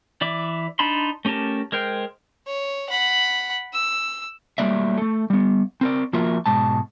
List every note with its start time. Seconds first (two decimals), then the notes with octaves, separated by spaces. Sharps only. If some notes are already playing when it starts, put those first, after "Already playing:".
0.21 E3 D5 E5 D6
0.79 D4 D#4 A5 B5 C6
1.25 A3 C#4 G4 A#4 A5
1.72 G#3 A#4 C5 G5
2.47 C#5
2.90 F#5 B5
3.73 E6
4.58 F#3 G3 A3 A#3 D5 E5
4.98 A3 A4
5.30 G3 B3
5.81 C4 A#4 D5
6.13 F3 A#3 F4 F#4 A#4 E5
6.46 G#2 B2 G#3 A5